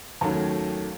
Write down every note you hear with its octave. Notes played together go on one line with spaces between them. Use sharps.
D#2 D#3 F#3 A3 C#4 A5